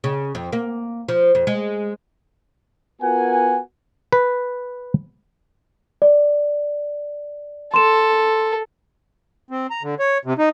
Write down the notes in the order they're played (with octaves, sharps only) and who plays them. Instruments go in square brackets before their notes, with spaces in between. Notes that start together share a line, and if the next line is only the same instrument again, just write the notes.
[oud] C#3
F2
A#3
F3
F2
G#3
[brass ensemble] B3 F4 F#4 A#4 F#5 G#5
[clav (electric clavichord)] B4
[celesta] D5
[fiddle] A4 [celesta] C6 E7
[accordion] C4
A#5
D3
C#5
C3
D#4